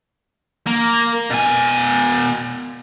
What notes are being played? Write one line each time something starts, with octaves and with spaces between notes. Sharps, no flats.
A#3
B2 G#5